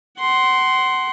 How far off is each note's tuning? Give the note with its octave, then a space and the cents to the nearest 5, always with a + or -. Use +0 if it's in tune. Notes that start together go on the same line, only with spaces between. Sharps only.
F#5 +25 C6 +0